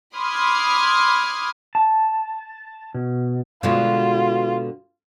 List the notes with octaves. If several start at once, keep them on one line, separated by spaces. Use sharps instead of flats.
B5 C6 D6 D#6 F6 G#6
A5
B2
B2 D3 G#3 F4